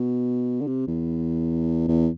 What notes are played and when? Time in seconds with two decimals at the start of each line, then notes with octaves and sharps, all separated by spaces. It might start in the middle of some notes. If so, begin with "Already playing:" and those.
Already playing: B2
0.61 D3
0.67 C3
0.87 E2
1.88 E2